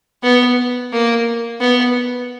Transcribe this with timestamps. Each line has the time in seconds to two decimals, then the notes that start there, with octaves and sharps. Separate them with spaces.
0.23 B3
0.92 A#3
1.60 B3